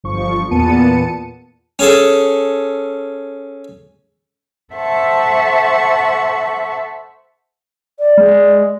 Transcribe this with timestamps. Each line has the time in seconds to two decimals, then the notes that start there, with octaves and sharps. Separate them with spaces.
0.04 G1 F3 C#6
0.51 E2 A#2 B3 A5 C#7 D#7
1.79 C#4 G#4 A4
4.74 A4 C5 E5 F#5 A5 C#6
7.99 D5
8.18 G#3